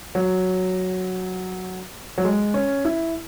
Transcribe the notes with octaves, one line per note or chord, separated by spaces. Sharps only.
F#3
F#3
G#3
C#4
E4